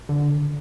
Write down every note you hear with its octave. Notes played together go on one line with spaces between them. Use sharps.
D3